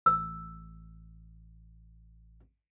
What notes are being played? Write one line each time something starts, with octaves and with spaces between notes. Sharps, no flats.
A1 E6